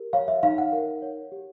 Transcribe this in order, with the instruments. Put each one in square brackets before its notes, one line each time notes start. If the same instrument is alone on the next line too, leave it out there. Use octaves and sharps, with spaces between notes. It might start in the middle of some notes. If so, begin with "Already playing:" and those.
Already playing: [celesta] G4 A#4
C#5 F5
E5
D#4 F5
F#5
A#4
C#5
G4